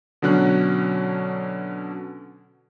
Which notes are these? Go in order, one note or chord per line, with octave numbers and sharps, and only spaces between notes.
B2 D3 F#3 C#4 F#6